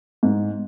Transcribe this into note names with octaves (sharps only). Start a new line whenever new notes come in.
G#2